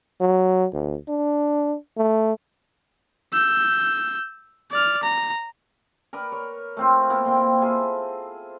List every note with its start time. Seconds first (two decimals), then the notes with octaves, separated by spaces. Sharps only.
0.21 F#3
0.73 D2
1.09 D4
1.97 A3
3.33 E6 G6
4.71 D5 F6
5.03 A#5
6.13 A#4 B4 D5 B5
6.32 C#5
6.77 A3 C4 F4
7.10 A#3 B3 E4
7.25 A#2 C4 G5
7.62 F4 G#4 A4 E5